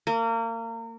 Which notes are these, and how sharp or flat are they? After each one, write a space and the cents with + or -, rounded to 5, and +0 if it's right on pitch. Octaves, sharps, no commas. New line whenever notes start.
A#3 -30